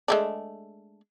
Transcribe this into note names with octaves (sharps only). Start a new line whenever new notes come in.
G#3 A3 D4